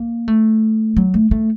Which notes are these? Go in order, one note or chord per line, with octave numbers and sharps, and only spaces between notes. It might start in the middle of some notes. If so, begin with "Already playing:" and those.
Already playing: A#3
A3
F#3
A3
A3